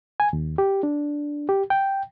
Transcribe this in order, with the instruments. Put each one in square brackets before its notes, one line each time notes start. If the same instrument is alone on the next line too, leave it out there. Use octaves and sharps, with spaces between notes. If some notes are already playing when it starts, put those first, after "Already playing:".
[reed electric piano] G#5
D#2
G4
D4
G4
G5